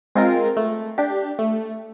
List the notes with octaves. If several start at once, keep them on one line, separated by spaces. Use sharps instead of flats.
G#3 C4 F4 A#4
A3
D4 G4
A3